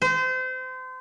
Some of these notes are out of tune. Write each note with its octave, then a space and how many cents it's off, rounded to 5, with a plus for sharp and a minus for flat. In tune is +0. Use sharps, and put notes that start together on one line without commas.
C5 -30